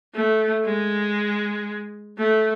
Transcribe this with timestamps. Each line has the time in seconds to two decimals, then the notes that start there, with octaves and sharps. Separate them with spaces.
0.14 A3
0.66 G#3
2.17 A3